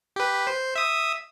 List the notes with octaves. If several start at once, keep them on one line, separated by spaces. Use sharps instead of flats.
G4 B4
C5
E5 D#6